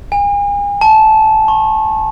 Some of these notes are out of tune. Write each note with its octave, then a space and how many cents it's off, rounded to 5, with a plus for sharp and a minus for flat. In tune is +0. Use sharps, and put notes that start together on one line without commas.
G#5 -40
A5 -15
C#6 -35